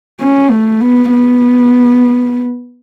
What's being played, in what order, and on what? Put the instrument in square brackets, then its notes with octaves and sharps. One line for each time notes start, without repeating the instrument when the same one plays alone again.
[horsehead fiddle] C#4
A3
B3
B3